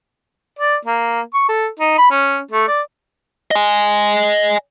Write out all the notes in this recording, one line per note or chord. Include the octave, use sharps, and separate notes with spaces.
D5
A#3
C#6
A4
D#4
B5
C#4
A3
D5
D#5 G#5